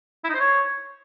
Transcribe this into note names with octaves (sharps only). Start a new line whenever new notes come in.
E4
D#4
C5
C#5